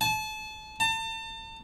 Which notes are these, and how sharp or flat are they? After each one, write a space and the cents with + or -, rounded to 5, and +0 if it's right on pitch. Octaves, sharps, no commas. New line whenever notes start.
A5 -30
A5 +35